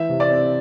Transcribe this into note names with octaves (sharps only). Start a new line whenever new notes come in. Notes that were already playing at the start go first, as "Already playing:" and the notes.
Already playing: E3 E5
C3
D5
C4